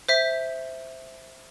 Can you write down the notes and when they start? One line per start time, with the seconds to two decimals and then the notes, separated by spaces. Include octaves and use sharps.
0.09 C5 E5 B6